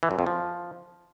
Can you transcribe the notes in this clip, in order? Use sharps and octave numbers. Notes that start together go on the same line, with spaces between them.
E3
F#2
F2
F3